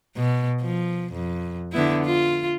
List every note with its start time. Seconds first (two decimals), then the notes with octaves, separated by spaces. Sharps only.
0.16 B2
0.61 F3
1.13 F2
1.72 D3 B3 E4
2.04 F4